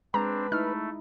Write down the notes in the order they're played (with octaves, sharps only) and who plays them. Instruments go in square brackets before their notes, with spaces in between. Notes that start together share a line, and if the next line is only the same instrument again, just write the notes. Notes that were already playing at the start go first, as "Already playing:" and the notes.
[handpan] G#3 [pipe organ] C4 D4 [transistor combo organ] B4 [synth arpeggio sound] A#5
[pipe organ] A3 [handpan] D#4 E4 [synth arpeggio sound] F6